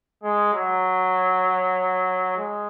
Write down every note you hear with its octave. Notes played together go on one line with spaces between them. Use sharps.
G#3
F#3
G#3